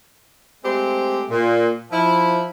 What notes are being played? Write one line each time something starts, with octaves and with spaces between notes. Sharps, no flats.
G#3 A3 C4 G4
A#2
F3 E4